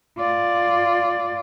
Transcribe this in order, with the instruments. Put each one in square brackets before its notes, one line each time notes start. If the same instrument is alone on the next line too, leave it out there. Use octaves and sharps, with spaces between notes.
[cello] F4 D5